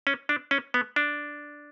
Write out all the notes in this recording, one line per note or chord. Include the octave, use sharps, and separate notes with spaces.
C#4
D4
C#4
B3
D4